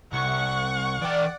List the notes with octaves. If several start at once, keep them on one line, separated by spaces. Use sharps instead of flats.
C2 F#5 C#6
E3 D5 G5